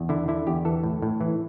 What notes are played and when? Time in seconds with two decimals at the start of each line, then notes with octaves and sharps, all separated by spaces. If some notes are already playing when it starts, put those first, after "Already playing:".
Already playing: E2
0.09 D3 E4
0.28 D3 E4
0.47 E2 G4
0.65 E3 A4
0.84 A2
1.02 A2
1.21 E3